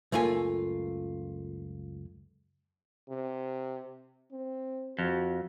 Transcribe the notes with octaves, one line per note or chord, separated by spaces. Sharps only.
C#2 F#2 A3 A#3 F4 G#5
C3
C4
F2 F#4